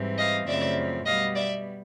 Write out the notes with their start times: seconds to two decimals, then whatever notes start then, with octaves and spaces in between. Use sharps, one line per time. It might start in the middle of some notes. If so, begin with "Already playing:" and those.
Already playing: G#2 E3 G3 C4
0.19 D#5 F5
0.47 F#2 C#3 F3 A3 C4 D5 E5
1.06 B2 G3 B3 D#5 F5
1.35 D5 E5